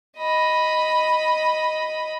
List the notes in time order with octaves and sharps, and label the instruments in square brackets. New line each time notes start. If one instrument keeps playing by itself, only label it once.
[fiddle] D#5 B5